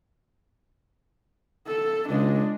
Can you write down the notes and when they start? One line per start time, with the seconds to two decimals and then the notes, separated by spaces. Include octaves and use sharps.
1.67 A4
2.09 C#2 G#3 D4